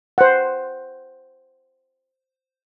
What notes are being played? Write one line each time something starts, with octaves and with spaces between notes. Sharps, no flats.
C5 F#5